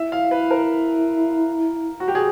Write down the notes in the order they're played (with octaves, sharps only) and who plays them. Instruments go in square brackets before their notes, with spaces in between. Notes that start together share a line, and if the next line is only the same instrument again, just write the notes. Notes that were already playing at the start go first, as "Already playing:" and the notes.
Already playing: [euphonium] E4 [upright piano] E5
[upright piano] F5
B4
A#4
F#4
G4
G#4